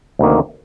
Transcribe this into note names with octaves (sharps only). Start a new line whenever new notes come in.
D2 C3 D#3 A#3